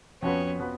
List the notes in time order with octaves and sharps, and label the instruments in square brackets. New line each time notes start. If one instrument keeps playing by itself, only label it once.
[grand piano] F2 F3 B3 F#4 B4 [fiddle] C#4
[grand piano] F3 B3 F#4 B4